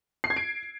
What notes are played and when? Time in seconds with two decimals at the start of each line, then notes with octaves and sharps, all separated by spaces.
0.24 C7
0.30 G#6
0.36 D7